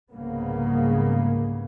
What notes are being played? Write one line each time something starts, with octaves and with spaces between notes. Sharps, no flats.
C2 G#2 C#3 A#3 B3